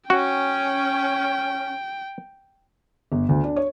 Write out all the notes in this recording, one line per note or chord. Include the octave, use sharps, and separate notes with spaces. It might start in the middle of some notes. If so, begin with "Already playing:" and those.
C#4 F#4 G5
G1
D2
D4
C#5